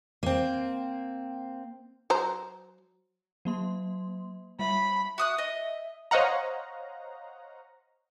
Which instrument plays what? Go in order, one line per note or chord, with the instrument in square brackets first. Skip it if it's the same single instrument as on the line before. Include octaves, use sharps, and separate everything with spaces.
[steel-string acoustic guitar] A#3 C4
[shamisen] F#3 C5 A#5
[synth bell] F#3 A#3 C6
[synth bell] G3 E5 [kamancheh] B5
[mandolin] F#4 D#6 F#6 [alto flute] E5
[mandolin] D#5
[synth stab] C5 C#5 D#5 F5 F#5 A#5